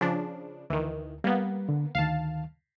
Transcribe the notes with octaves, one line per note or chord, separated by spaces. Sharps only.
C#3 F3 D4
D2 D#3 E3
G3 A#3 B3
D3
D2 D#3 F5 A5